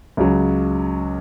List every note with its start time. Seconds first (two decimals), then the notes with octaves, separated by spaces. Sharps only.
0.17 C#2 C#3 F#3